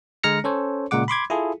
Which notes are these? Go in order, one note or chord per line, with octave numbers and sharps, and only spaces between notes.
D3 G#3 A#5 F6 A#6 C#7
C#4 A4 C5 C#5
A#2 C#3 G#3 F#5 D6
B5 C6 D6 G#6
E4 F4 G#4 A4